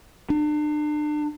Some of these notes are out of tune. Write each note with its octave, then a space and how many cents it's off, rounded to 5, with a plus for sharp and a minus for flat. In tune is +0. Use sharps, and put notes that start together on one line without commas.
D4 +35